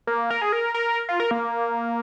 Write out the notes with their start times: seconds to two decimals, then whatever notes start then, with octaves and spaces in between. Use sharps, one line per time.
0.07 A#3
0.31 A#4
0.42 G#4
0.52 A#4
0.74 A#4
1.09 F4
1.20 A#4
1.31 A#3